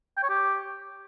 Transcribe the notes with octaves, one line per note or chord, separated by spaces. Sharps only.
G5
C#5
G4